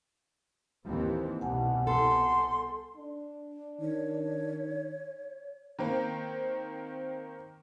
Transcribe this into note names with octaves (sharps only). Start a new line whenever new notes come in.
D#2 E3 C4
C2 B2 F#5 G#5 A5
A4 C6
D4
D#3 C#5
D#3 A#3 C4